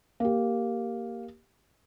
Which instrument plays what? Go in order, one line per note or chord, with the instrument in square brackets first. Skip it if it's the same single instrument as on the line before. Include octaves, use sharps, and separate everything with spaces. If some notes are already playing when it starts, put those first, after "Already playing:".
[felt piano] A#3 G4